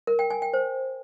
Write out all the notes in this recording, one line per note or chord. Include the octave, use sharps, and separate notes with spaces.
A#4
G5
G#5
G5
C5